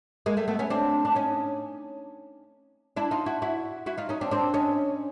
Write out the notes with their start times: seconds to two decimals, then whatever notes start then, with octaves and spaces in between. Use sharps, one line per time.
0.26 G#3 A#3
0.37 G3 A3
0.48 A3 B3
0.59 B3 C#4
0.70 C4 D4
1.05 D4
1.15 C#4 D#4
2.97 D4 E4
3.11 D#4 F4
3.26 E4 F#4
3.42 E4 F#4
3.86 E4 F#4
3.98 D#4 F4
4.09 C#4 D#4
4.21 C4 D4
4.31 C4 D4
4.54 C#4 D#4